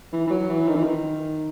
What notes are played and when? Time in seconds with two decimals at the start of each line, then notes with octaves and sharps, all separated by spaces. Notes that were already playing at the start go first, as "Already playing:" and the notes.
0.13 E3
0.27 E3
0.30 F#3
0.49 E3
0.68 D#3
0.75 E3
0.83 D#3